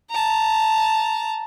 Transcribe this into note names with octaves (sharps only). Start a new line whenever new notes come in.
A5 A#5